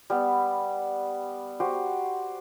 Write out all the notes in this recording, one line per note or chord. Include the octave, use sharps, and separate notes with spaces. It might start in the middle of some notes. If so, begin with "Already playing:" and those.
G3 B3
F#4 G4 C5